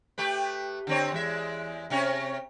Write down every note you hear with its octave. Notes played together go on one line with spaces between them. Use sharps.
A3 G4 B4
D3 C4 C#5
E2 G#3 E5
C3 C#4 C#5